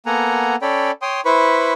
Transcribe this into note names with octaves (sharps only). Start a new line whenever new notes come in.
A#3 B3 A4 F#5 G#5 A#5
C#4 A4 C#5 D5 G5 B5
C#5 G5 C6 D#6
E4 B4 C5 B5 C#6